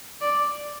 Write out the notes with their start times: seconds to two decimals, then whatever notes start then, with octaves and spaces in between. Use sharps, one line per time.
0.21 D5